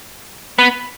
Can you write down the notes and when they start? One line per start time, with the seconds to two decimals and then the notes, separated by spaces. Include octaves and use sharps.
0.59 B3